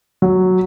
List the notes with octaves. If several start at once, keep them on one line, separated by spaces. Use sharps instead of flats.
F#3